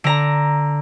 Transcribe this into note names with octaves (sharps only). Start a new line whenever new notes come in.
D3 A#5